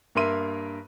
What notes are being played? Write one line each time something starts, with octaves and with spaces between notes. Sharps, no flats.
G2 A#3 A#4 E5 C6 D#7